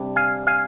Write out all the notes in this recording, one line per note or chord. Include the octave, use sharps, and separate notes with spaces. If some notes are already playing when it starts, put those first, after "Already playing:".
Already playing: C3 G3 D4
F5 G#5
F5 G#5